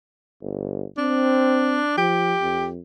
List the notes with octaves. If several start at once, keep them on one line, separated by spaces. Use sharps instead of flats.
G1
C4 D4
F3 G4
F2